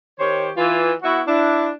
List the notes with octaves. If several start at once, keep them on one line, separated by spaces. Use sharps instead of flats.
D#3 G4 C5 C#5
E3 F4
B3 E4 F#4
D4 E4